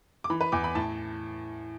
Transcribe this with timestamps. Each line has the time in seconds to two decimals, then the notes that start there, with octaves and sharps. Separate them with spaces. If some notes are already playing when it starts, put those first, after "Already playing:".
0.24 D6
0.30 E3 B5
0.41 B4
0.52 E2 D6
0.64 B5
0.75 A2 A5